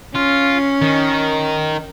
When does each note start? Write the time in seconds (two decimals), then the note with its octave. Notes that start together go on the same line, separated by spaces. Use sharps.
0.15 C#4 F4
0.82 D#3